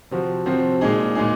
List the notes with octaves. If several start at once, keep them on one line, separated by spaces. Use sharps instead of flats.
C3 F3 C4 F#4
C3 F3 C4 F#4
A#2 G#3 D#4 G#4
A#2 G#3 D#4 G#4